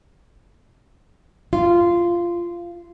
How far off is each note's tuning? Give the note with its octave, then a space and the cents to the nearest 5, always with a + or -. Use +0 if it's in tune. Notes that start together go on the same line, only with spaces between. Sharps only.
F4 -15